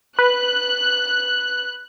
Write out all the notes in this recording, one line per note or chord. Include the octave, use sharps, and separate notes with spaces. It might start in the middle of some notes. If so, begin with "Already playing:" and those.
B4 F#6